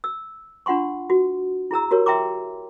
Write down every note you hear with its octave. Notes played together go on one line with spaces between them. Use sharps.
E6
D4 F4 F#5 C6 C#6
F#4
E4 G#4 A#5 E6
F#4 G4 A#4 C#5
E5 G5 A#5 C6 D6